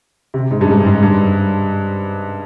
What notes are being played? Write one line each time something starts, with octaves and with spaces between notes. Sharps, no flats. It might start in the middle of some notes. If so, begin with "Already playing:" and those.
C3
G#2
G2
G#2
G#2
G2